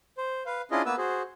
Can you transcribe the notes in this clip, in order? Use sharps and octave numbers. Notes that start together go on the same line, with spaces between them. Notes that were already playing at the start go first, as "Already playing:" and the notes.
C5
B4 F5
C#4 D4 E4 F4 G#4 D#5
A#3 B3 B4 E6
F#4 G#4 C5